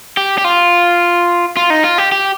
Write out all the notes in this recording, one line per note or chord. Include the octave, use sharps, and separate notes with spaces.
G4
G4
F4
F4
D#4
F4
G4
G4